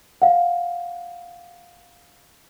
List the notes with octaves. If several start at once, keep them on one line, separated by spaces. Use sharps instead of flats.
F5 F#5